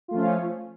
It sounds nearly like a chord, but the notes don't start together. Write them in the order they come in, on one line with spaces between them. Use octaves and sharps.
F4 A3 F3 C#4